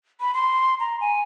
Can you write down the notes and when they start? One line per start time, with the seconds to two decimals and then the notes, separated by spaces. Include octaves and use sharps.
0.20 B5
0.34 C6
0.80 A#5
1.01 G#5